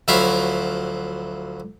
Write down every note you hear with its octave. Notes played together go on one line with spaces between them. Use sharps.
D2 F3 F#3 E4 E5 F5